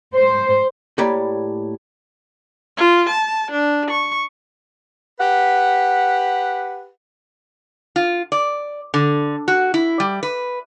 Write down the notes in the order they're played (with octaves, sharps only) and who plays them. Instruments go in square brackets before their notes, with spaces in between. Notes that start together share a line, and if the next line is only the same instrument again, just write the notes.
[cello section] C5
[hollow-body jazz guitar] A2 A#3 G4 C#5 D5 B5
[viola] F4
A5
D4
C#6
[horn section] G4 B4 F#5
[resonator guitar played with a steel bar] F4
D5
D3
F#4
E4
G3
B4